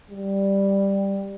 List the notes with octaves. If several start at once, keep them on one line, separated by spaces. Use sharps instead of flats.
G3